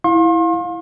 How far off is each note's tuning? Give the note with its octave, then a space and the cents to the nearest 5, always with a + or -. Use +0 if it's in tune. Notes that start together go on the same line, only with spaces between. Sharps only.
E4 +0 F5 +25 C6 +40